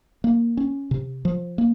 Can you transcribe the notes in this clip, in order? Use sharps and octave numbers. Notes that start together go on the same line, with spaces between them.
A#3
C#4
C3
F3
A#3